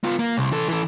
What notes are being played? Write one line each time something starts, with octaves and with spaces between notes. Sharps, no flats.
B3 F4
A#3
C2
E3 A4
E3 A4